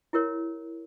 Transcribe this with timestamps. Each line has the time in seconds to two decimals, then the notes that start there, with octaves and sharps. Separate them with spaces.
0.13 E4 G4 A#4 C#5